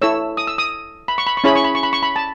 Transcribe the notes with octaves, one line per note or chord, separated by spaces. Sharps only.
E4 A4 C#5 E6
D#6
E6
D#6
B5
C#6
B5
C#6
C#4 E4 G#4 C#5 B5
C#6
B5
C#6
B5
C#6
B5
A5